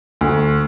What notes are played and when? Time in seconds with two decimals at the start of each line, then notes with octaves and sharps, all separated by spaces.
0.21 D2